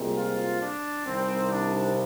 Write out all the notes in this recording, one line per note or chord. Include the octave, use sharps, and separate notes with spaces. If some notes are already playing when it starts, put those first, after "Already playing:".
Already playing: C2 A#2 G#3 C4
F4
D4
C2 C3 D#3 C4
D4